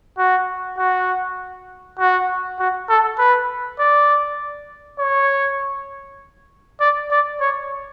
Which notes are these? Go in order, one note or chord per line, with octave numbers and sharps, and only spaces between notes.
F#4
F#4
F#4
F#4
A4
B4
D5
C#5
D5
D5
C#5